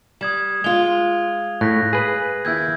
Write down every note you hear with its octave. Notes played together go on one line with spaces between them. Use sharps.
G3 D#6 G#6 E7
G#3 F4 F7 G7
A2 F#6 A#6 B6
G#4 B4
D#2 E4 E6 G6 G#6